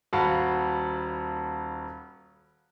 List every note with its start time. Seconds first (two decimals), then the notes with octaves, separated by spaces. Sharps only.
0.13 D#1 F#4 F5 F#5 A5 B5